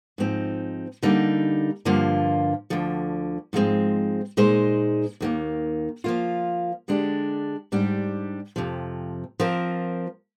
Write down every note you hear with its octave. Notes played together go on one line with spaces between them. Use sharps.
G#2 F3 C4 D#4
D3 G3 A#3 D#4
G2 D3 F3 A#3 F4
D2 D3 F3
G#2 F3 G#3 C4
A#2 G#3 D#4 G#4 C5
D#2 D#3 G3 A#3
F3 A#3 F4
D3 G#3 D4 G4
G#2 G3 D4 G4
F2 C3 F3
F3 C4 F4 A#4